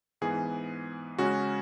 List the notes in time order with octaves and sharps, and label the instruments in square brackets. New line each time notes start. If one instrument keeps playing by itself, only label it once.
[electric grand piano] G#2 E3 B3 G#4
C#3 G#3 C#4 F#4